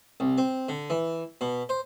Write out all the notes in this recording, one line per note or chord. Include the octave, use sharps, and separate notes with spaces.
C2
C4
D3
E3
B2
C5